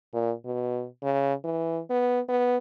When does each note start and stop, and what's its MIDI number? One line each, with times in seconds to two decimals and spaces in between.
0.13 0.33 46
0.45 0.86 47
1.03 1.34 49
1.44 1.80 52
1.90 2.20 59
2.29 2.58 59